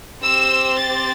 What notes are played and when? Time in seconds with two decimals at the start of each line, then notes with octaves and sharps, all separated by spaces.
0.22 C4 G4 E6
0.78 A6